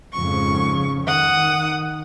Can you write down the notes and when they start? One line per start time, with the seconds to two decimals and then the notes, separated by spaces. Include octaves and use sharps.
0.13 F2 G#2 C#3 C#6
1.07 D#3 F#5 D#6